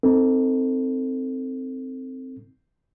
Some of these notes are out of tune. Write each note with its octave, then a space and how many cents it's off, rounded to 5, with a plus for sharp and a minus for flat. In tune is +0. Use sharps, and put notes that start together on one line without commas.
C4 +0 D#4 +15 A4 +20